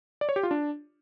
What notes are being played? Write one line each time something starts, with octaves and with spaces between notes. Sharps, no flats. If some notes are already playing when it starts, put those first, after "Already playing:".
D5
C#5
G4
F4
D4